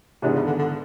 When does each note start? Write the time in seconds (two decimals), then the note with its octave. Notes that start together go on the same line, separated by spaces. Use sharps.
0.22 G#2 C3 E3 G#3 B3 D4
0.35 C#3
0.47 D3
0.58 D3